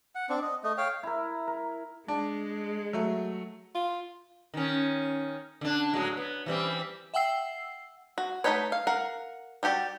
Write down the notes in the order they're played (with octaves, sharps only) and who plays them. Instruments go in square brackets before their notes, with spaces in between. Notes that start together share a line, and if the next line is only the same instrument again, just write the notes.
[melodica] F#5
C4 D4
D#5
A3 D#5
C#5 F5 G5
[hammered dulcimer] E4 A#4
A#4
[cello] G#3 [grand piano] D4
[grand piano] F#3 A3
[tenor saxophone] F4
[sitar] D#3 C#4
D3 D4
A2 F#3 G#3
B3
E3 G3 C4
[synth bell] E5 F#5 G5 E6 C7
[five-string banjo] F#4
A3 A#3 D#4 B4 C#5
F5
A#4 F5 F#5
G3 F#4 G4 D5